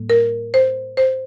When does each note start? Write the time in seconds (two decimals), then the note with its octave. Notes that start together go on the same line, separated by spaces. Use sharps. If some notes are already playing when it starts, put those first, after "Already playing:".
Already playing: A2 G3 A#3
0.10 A#4
0.54 C5
0.97 C5